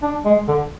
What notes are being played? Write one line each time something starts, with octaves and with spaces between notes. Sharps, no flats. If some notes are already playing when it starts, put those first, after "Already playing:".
D4
G#3
D3